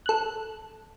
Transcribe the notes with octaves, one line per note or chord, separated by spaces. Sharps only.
A4 F#6